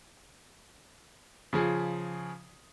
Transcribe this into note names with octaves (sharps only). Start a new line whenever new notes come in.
C#3 F3 G#4